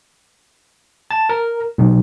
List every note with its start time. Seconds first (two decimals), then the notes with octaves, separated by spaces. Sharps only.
1.11 A5
1.29 A#4
1.78 B1